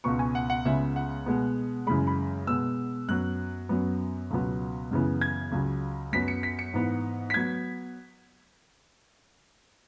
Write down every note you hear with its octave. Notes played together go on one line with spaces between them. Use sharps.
C#2 B2 B3 C#6
G#5
F#5
F#5
C#2 C#3 G#3 B3 E5
F#5
B2 G#3 B3
F#2 C#3 E3 G#3 B5
B5
B2 G#3 B3 E6
F#2 F#3 B3 F#6
F#2 F#3 B3
C#2 B2 F#3 B3
F#2 C#3 E3 B3
G#6
C#2 C#3 F#3
F#2 F#3 B3 B6
C#7
B6
C#7
G#2 E3 B3
B6
F#3 B3 G#6